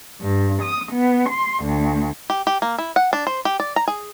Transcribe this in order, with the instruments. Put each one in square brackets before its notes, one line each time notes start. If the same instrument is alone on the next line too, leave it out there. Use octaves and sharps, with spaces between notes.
[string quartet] G2
D#6
B3
C6
D2
[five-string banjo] G4
G4
A#3
E4
F#5
D4
C5
G4
D5
A#5
G#4